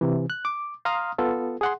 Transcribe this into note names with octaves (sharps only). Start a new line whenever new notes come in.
C3 E3
F#6
D6
F5 A#5 C6 D#6 F6
B3 F4 A4
G#4 F#5 C6